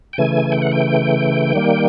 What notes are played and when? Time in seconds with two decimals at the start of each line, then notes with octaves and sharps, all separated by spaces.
0.13 G5
0.18 C#3 E3 A3 G#5
0.52 G5
0.62 F#5
0.72 G5
1.53 D#3 G3 A#3